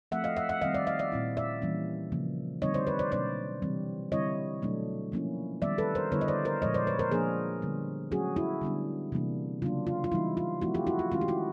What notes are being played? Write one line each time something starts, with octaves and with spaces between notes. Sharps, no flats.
F3 A3 C4 E5 F#5
D#5 F5
E5 F#5
E5 F#5
D#3 G3 C4 D#5 F5
D5 E5
D#5 F5
D5 E5
A#2 G3 C4 E4
D5 E5
E3 G3 A#3 C#4
C#3 F3 A#3
D3 G3 C4 D#4 C#5 D#5
C5 D5
B4 C#5
C5 D5
B2 F#3 A#3 D4 C5 D5
C3 E3 G3 C4
D3 G3 C4 E4 C#5 D#5
B2 F#3 A3 D4
F3 A#3 C#4 E4
D#3 G3 B3 D5 E5
A4 B4
A#4 C5
D3 G3 B3 E4 B4 C#5
D#5
C5 D5
A#4 C5
A#2 F3 G#3 C#5 D#5
C5 D5
B4 C#5
A#4 C5
F3 A#3 D4 G#4 A#4
D3 G3 B3
F#3 A3 C#4 F#4 G#4
E4 F#4
D3 G3 B3 D4
C3 E3 G3 A#3 D4
C#3 F#3 A#3 D4 F4
F4
F4
E3 G3 B3 D#4 E4
F4
F3 A3 C4 E4 F#4
F4 G4
E4 F#4
F4
D#3 G#3 C#4 E4 F4
G4
E4 F#4